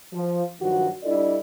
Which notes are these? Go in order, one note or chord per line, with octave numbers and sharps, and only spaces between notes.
F3
G2 D#3 F3 F#3 F#4
G3 D4 E4 A4 D5 D#5